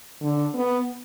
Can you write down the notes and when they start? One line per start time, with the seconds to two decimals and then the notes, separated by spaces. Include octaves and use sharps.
0.21 D3
0.54 B3